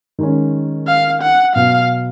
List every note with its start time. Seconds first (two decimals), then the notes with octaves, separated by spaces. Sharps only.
0.19 D#3 G#3 C#4
0.87 F5
1.22 F#5
1.55 B2 F#3 B3 F5